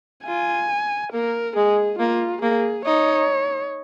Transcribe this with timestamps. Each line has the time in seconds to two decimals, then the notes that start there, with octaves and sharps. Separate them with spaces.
0.27 F4 G#5
1.13 A#3 A#4
1.56 G#3 G#4
1.99 A#3 F4
2.42 A#3 G#4
2.85 D#4 C#5